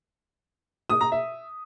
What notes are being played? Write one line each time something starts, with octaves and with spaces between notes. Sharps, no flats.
D#6
A#5
E5